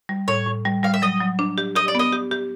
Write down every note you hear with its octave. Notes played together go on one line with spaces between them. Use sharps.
G3
A2 C#5
A2
G3
G3 F5
E5
F#3 D#5
F#3
D4
G4
G4 D#5
D5
B3 D#5
G4
G4